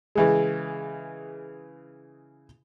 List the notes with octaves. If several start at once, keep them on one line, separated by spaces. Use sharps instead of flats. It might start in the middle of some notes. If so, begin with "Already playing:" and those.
C#3 E3 G#3